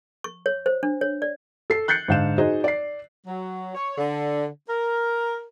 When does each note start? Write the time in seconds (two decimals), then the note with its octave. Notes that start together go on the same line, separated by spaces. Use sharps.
0.24 C#6
0.46 C#5
0.66 C5
0.83 D4
1.01 C#5
1.22 D5
1.70 A4 C7
1.88 F#6 G6 A6 C7 C#7
2.08 G#2 D3 F5 G6 E7
2.38 D#4 F#4 G#4 C5 D#5
2.64 D5 C7
3.27 F#3
3.75 C#5
3.98 D3
4.68 A#4